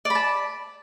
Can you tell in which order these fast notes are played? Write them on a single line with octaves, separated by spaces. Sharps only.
D5 B5 A5